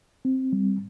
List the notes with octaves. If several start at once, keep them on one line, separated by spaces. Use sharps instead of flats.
C4
G3